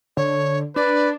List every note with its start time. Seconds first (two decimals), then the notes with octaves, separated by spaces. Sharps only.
0.17 D3 C#5
0.76 D4 B4 D5